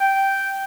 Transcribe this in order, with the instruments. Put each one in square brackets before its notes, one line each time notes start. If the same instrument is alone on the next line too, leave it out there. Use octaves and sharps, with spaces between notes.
[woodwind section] G5